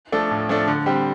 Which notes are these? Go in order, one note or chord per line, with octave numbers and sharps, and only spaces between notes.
F3 A3 D4 A4
A2
F3 A3 D4 A4
D3
G3 C4 G4